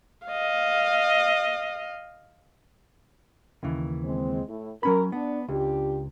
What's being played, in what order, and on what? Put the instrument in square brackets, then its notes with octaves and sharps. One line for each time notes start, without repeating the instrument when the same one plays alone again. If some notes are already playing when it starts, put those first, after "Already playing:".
[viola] D#5 F5
[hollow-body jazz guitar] D#2 C#3 E3
[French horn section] G#3 C4
A2 E4
[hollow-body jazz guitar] F#3 C#4 B5 [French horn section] A#4
[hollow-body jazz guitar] B3 [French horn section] D4
[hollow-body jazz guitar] C#2 [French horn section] D4 F4 G4